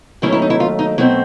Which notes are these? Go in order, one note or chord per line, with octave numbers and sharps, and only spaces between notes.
D#2 D#3 F#3 A3 C#4 E4
E4
D#4
E4
F4
D#4
B2 F#3 A3 C4 D#4 E4